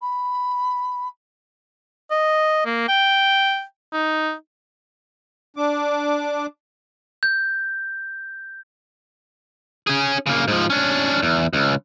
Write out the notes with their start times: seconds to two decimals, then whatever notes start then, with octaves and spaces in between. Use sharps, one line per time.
0.01 B5
2.10 D#5
2.66 A#3
2.88 G5
3.93 D#4
5.57 D4 D6
7.23 G6
9.87 C#4 G#4
10.26 C#3 A#3
10.48 G#2 F3
10.70 C#4 D4
11.22 E2
11.53 C#2